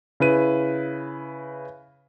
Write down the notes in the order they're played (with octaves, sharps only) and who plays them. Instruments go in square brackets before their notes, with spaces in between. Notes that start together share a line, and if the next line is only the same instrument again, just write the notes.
[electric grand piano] C#3 E4 B4 D#7